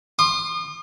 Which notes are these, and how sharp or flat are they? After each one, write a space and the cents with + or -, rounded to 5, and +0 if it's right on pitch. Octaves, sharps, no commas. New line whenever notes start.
C6 +30 D#6 -40